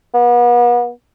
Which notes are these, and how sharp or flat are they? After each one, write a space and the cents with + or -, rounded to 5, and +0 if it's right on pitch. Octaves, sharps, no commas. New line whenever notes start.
B3 -40